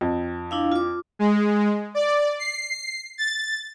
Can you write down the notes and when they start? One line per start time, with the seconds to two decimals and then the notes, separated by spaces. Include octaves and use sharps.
0.01 F2
0.51 D4 E4 F5
0.72 F4 D6
1.19 G#3
1.95 D5
2.39 C7
3.18 A6